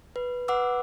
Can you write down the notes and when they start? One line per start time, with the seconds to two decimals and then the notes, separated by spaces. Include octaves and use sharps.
0.16 B4
0.48 B4 F#5 D6 E6